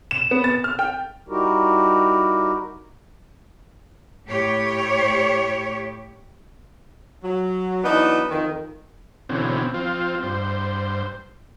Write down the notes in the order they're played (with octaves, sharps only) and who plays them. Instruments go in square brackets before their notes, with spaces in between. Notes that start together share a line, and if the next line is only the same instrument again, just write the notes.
[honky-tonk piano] E7
B3
A6
F6
G5
[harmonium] G3 D#4 E4 F#4 G4 A#4
[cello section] A2 G4 C#5
[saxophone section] F#3
E3 F#3 B3 D4 D#4
F2 D#3
[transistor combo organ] B2 D3 E3 C4 C#4
F3 C4 F4
G2 C5